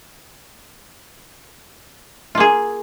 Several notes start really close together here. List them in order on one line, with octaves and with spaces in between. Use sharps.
F4 A#3 G#4